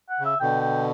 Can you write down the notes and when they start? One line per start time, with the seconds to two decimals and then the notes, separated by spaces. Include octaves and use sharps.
0.09 F#5
0.20 C#3
0.25 E5
0.40 B2 D3 G5
0.61 G5